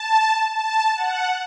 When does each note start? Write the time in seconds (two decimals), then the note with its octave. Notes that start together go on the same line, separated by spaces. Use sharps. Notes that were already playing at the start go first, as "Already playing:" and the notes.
Already playing: A5
0.55 A5
0.96 F#5